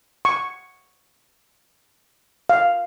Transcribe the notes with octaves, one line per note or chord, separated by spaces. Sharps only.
C#6
F5